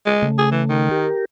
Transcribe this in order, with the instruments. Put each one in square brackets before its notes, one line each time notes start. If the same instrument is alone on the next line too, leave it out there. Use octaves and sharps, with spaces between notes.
[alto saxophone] G#3
[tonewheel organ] C#3 A3
[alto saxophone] G#4
E3
D#3
[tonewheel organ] G4 A#4